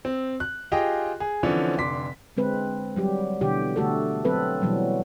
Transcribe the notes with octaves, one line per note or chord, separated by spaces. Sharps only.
C4
F#6
F4 G4 G#4 D#5 G5
G#4
D3 E3 F3 C4 C#4 C#5
F1 D3 C6 D6 B6
D3 G#3 C4 B4
F#3 G3 G4
B2 D3 E3 G4
D3 A3 F#4 A4
F#3 C4 A4 B4
B2 E3 F#3 G3